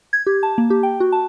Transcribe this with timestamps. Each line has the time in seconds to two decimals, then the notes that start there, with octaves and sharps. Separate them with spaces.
0.13 G#6
0.27 G4
0.43 A5
0.58 A#3
0.70 G4
0.83 G5
1.00 F#4
1.12 A5